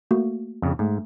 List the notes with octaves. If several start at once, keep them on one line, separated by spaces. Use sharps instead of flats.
A3 A#3 F#4
F2 C#3
G#2 A3